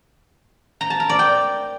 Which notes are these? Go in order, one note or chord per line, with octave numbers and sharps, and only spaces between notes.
A#5
A5
A#4
D5
G5